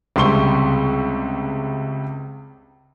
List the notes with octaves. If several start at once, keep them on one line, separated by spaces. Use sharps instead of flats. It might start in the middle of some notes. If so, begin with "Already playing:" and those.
C#2 C3 G3 C6 C#6 G7